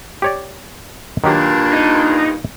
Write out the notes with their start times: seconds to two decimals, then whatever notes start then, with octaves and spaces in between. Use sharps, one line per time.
0.22 G4 C#5 D5
1.24 G2 A#2 D#3 F#3 D4 G4
1.73 D#4